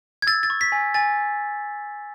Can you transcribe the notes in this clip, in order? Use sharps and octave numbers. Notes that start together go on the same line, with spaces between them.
G#6
E6 A6
A6
C#6
B6
G#5
G#5 A6